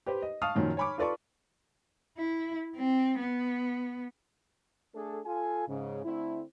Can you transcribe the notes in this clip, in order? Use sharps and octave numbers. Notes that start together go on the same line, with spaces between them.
G4 B4 C5
D#5
F5 A5 C#6 D#6 F6
F#2 A#2 D#3 F3 F#3
C#5 G#5 B5 C#6 D6
F4 A4 B4 D5 A5 C#6
E4
C4
B3
A3 D4 G#4 A4
F4 A4 G#5
G#2 C#3
D3 A3 C4 E4